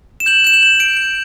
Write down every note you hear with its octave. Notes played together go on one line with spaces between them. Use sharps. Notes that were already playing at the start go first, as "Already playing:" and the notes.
E7
G6 F#7
G6 E7
F#7
G6
G6 D7
G6